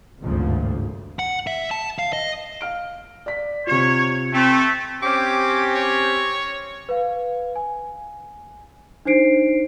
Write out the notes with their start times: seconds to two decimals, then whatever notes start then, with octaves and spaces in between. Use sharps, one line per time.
0.21 G#1 D2 G2 A#2 C#3 F3
1.19 F#5
1.47 E5
1.71 A5
1.99 F5
2.13 D#5
2.61 F5 F6 D7
3.26 D5 B6
3.67 C3 F4 C#5
4.34 A3 C4
5.02 C4 C#4 G4 D6
5.75 C#5
6.89 B4 F5
7.56 G#5
9.05 D4 D#4 C5 C7 D7